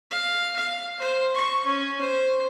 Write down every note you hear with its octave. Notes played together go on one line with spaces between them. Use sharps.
F5
F5
C5
C#6
C#4
C5